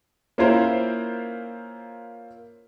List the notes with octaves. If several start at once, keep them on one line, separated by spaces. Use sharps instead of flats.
A#3 C#4 E4 F4 A#4 C5